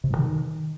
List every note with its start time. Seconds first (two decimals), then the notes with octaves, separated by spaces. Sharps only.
0.04 C3
0.10 G2
0.17 D#3